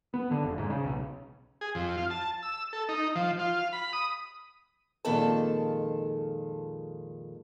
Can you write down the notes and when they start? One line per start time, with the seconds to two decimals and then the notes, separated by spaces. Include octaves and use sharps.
0.14 B3
0.31 D3
0.44 F1
0.58 G#2
0.70 C#3
0.84 B1
1.61 G#4
1.75 F2
1.97 F4
2.10 A5
2.43 E6
2.73 A4
2.89 D#4
3.15 F3
3.39 F4
3.59 F5
3.73 B5
3.93 D#6
5.05 F2 A#2 D#3 G#3 A4 A5